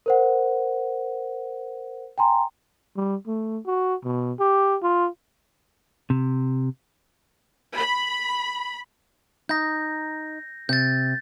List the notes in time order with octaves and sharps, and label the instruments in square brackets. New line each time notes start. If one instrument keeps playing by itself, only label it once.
[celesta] A#4 C5 F#5
G5 G#5 A#5 C6
[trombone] G3
A3
F#4
B2
G4
F4
[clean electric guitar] C3
[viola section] B5
[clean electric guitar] D#4 [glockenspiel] G6 A#6
[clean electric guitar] C3 [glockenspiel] G6 A6